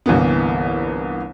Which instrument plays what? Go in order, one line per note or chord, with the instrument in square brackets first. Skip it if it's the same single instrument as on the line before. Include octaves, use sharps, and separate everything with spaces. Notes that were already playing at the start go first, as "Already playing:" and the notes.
[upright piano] G1 C2 E3 A#3 B3